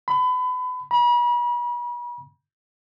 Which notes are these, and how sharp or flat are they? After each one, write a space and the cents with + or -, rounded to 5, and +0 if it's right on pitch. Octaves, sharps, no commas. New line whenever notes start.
B5 +30
B5 -40